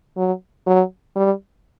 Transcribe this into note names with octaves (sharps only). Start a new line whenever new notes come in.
F#3
F#3
G3